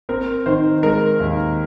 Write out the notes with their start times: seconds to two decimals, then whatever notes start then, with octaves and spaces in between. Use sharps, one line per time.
0.09 C4 A#4
0.46 D#3 C5
0.83 G#3 A#4
1.20 D#2